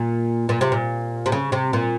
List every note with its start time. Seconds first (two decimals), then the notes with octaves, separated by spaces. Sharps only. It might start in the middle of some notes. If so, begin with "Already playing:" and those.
Already playing: A#2
0.49 A#2
0.61 C3
0.72 A#2
1.26 C3
1.32 C#3
1.52 C3
1.73 A#2